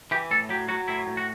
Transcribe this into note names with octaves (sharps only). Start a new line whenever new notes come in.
E3 G4
A2 A4
F#3 G4
F#3 F#4
A2 E4
A2
F#4